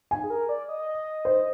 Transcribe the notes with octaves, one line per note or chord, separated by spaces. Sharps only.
G#5
G#4
A#4
D5
D#5
C5